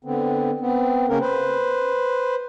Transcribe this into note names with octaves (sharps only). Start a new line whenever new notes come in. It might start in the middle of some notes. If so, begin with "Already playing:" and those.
D3 B3 C4
B3 C4
C#3 A#3 C#4 A#4
B4 C5